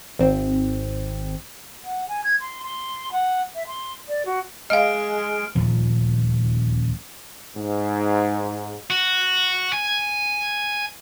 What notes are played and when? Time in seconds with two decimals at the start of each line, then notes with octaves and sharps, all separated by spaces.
0.19 G#1 C4
1.84 F#5
2.08 G#5
2.24 G#6
2.41 C6
2.63 C6
3.12 F#5
3.55 E5
3.67 C6
4.08 D5
4.26 F#4
4.70 G#3 D#5 F5 F6 D7
5.55 D#1 D2 A#2 F3
7.56 G#2
8.90 F#4
9.73 G#5